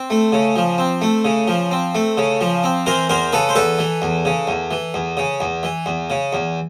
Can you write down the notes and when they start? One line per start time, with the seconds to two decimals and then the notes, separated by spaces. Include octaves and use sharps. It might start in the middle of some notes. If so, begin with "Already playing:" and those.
Already playing: C4
0.10 A3
0.32 C#3
0.56 F3
0.78 C4
1.01 A3
1.25 C#3
1.48 F3
1.71 C4
1.95 A3
2.18 C#3
2.41 F3
2.64 C4
2.86 E3 A#4 C5
3.09 E2 A#4 C5
3.32 C#3 A4 B4
3.49 C5
3.55 E2 A4 B4
3.79 E3
4.02 E2
4.25 C#3
4.47 E2
4.71 E3
4.94 E2
5.17 C#3
5.40 E2
5.63 E3
5.86 E2
6.10 C#3
6.33 E2